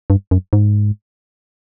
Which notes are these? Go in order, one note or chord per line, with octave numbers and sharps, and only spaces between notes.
G2
F#2
G#2